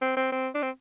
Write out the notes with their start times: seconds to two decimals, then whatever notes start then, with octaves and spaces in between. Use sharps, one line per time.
0.02 C4
0.17 C4
0.32 C4
0.55 D4
0.62 C4